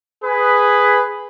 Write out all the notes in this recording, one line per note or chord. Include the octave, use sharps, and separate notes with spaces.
G#4 B4